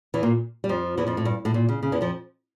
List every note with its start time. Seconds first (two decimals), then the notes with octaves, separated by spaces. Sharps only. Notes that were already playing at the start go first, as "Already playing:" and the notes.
0.14 E2 E3
0.23 A#2 A#3
0.64 G3
0.69 F2 F3
0.97 E2 E3
1.07 F2 F3
1.17 A2
1.25 G2
1.45 A2
1.54 A#2
1.69 C#3
1.83 C#3
1.92 E2 E3
2.01 F2 F3